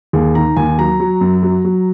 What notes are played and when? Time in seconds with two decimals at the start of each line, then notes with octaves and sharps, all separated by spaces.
0.13 D#2 G#4
0.35 D#3 A#5
0.56 D#2 G#5
0.78 F#3 A#5
1.00 F#3
1.21 F#2
1.43 F#3
1.65 F#3